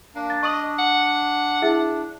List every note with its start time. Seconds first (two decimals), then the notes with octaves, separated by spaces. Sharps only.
0.15 A#3 D4
0.30 A6
0.43 D#5 C#6 D#6 F#7
0.79 F#5
1.62 E4 G#4 E5